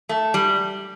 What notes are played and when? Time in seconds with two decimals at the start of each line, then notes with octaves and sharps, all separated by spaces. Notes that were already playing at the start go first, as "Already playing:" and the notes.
0.09 A3
0.34 G3